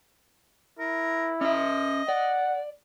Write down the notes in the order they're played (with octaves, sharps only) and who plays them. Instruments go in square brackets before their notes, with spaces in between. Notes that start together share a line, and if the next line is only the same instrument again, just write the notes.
[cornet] E4 [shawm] A#4
[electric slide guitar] C#4 E5 [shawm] D#5
[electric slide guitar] D5 [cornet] F#5